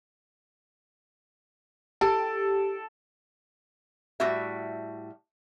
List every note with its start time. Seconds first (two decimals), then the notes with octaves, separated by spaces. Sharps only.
2.01 G4 A4
4.20 A2 G3 F#4 E5